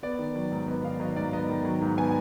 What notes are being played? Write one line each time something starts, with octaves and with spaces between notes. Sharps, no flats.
B3 D5
D#3
F#3
G#2
B3 D#5
D#3 F5
F#3 D#5
G#2 D5
B3 D#5
D#3
F#3
G#2
B3 G#5